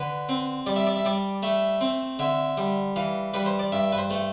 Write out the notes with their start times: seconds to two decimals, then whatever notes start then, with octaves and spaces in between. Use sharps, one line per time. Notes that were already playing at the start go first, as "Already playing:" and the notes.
Already playing: D3 B4
0.29 C4
0.66 G3 D5
0.76 E5
0.87 D5
0.96 E5
1.05 G3 D5
1.43 A3 E5
1.81 C4
2.19 D3 E5
2.57 G3
2.96 E3 F5
3.34 G3 B4
3.46 C5
3.59 D5
3.72 G2 E5
3.92 B4
3.98 C5
4.10 A3